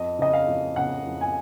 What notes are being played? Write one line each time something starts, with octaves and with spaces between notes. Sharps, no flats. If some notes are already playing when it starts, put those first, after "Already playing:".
Already playing: F2 D#5
C#3 D#5
F5
F2
C#3 F#5
F2
G#5